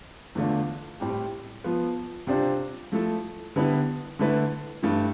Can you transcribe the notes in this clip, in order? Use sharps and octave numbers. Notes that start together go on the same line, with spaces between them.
E2 D3 A3 D4 F4
A2 G3 C4 G4
F3 B3 F4
C3 G3 D4 F4 C5
F3 A3 E4 A4
D3 G3 B3 E4 B4
D3 A3 E4 B4
G2 E3 A3